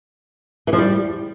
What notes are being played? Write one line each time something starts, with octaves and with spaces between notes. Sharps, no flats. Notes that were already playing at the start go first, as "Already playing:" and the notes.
E3
F3
G3